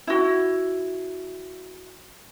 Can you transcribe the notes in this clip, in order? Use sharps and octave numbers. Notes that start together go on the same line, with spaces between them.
E4 F#4